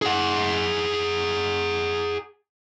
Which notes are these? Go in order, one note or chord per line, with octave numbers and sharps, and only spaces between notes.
G#4 F#5